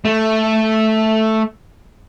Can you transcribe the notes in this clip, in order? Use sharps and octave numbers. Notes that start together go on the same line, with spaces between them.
A3